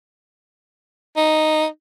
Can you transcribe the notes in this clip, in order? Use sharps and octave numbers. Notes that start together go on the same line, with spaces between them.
D#4